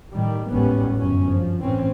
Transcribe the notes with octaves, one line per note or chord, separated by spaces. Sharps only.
A2 D#3 G3
G#1 D#2 A2 G3 B3 C#4
G1 F#2 C#4
F3
A2 E3 C4 C#4